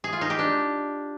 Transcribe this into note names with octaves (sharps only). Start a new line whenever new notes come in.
G#4
F4
D#4
G4
D4